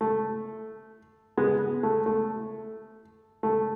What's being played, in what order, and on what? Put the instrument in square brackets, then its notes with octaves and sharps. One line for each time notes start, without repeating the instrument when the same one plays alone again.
[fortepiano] A3
G#3 B3
A3
A3
A3